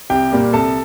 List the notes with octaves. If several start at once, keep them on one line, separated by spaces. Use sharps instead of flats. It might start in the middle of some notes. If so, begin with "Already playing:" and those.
C2 G4 G5
A#2 G3 A#3
C2 A4 A5